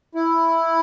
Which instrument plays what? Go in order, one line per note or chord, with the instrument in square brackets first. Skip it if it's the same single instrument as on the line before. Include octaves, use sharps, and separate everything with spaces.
[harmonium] E4